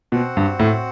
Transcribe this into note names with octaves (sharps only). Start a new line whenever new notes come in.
B2 C4 F#4 C5 F#5
G2
A2